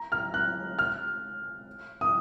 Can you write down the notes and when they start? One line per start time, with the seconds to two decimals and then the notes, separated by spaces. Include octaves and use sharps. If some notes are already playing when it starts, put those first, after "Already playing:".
Already playing: A#5
0.12 F6
0.34 F#6
0.79 F6
2.01 D#6